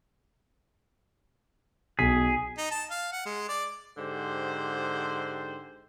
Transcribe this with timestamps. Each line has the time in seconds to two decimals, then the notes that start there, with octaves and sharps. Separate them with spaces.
1.99 B1 G#4 B6
2.58 D#4
2.71 A5
2.91 F5
3.12 F#5
3.25 G#3
3.49 D5
3.98 G#2 D3 G4 C5